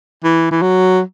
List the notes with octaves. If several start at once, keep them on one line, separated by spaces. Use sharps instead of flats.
E3
E3
F#3